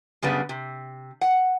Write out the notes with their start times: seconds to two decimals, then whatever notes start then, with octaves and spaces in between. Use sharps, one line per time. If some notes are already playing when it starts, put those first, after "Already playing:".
0.22 F#2 C#3 G3 B3 D4
0.49 C3
1.21 F#5